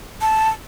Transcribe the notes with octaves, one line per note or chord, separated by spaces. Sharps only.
A5